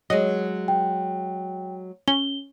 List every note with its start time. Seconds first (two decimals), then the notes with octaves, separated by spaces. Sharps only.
0.10 F#3 G#3 D#5
0.68 G5
2.08 C#4 G7